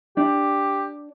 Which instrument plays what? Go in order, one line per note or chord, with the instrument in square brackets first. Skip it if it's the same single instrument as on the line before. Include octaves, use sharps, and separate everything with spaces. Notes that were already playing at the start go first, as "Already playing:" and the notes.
[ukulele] D4 [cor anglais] G4